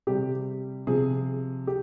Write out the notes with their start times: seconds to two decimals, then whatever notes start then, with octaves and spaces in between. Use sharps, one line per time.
0.07 C3 G3 G4
0.87 C3 F3 G#4
1.67 G4